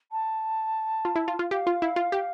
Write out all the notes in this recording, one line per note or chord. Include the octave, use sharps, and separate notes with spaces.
A5
F4
E4
F4
F4
G4 F5
F4
E4
F4
G4